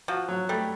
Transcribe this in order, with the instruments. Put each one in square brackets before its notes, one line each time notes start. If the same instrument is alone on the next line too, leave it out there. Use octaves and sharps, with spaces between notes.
[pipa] F3 [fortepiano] F#4
[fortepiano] F#3
[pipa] G3 [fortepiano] A3